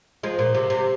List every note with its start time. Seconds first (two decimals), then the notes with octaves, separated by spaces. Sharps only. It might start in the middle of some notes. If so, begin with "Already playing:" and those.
0.23 F3 G#3
0.39 A#2
0.54 C3
0.70 C3